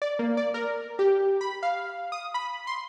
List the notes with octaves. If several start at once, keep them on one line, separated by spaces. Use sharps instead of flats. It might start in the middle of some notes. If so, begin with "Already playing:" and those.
D5
A#3
D5
A#4
G4
B5
F5
D#6
B5
C6